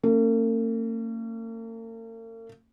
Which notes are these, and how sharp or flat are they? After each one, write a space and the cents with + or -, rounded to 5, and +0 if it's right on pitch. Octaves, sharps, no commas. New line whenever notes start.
A#3 -45 C#4 -15